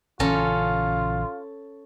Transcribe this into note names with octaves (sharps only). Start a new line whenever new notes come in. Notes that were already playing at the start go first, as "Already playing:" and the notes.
A#1 C#3 E3 C#4 F4 A4 A#5